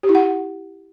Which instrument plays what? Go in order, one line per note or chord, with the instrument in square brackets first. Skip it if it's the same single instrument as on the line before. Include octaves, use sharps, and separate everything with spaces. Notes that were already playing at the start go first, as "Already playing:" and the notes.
[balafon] G4
E4
F#5